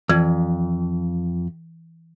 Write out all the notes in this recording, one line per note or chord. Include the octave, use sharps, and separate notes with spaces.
F2 E3 G#6